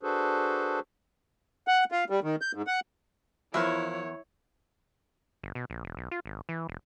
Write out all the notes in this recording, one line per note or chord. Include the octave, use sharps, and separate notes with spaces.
D4 F#4 G#4 A4 B4 C5
F#5
F4
G3
D#3
G6
G#2
F#5
E2 F3 E4 A#4 B4 C#5 E5
G1
B2
A#1
E1
B1
F4
G#1
E3
E1